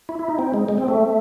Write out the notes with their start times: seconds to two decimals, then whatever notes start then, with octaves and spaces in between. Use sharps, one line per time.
0.09 E4
0.19 E4
0.29 D#4
0.39 C4
0.54 G#3
0.69 G#3
0.78 C4
0.88 A3